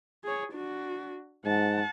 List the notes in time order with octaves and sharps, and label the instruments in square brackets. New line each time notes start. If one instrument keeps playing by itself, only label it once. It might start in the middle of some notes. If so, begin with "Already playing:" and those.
[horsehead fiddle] G#4 C#5
D4 F#4
[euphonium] G#2 [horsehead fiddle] F#5 A5